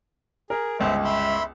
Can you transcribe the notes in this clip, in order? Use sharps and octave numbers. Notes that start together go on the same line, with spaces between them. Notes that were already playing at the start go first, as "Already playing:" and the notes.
G#4 A#4
G1 C#2 C5 E5
E5 B5 C6